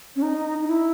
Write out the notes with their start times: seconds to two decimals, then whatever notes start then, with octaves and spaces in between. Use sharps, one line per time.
0.16 C#4
0.22 D#4
0.62 D#4
0.68 E4